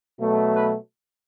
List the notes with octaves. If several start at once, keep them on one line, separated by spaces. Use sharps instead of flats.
B2 F#3 A3
B4